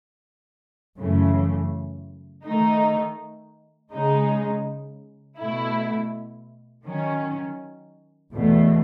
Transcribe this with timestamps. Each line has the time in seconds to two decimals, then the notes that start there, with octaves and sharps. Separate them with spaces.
0.99 F#2 C#3 E3 A3
2.45 D#3 A3 D#4
3.92 C#3 G#3 D#4
5.38 B2 A3 E4
6.85 D#3 F#3 C#4
8.33 E2 B2 A3